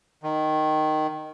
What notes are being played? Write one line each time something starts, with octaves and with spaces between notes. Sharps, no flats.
D#3